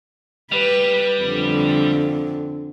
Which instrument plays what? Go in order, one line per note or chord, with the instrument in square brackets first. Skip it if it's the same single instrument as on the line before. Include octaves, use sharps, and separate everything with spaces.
[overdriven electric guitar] G3 [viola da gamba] B4
[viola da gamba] F2 D3